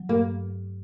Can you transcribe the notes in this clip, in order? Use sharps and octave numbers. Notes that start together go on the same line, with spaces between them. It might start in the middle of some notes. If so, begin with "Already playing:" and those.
Already playing: F#3
G2 A#3